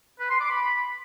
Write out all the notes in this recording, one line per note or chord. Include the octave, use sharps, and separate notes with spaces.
B4
C6
D6
B5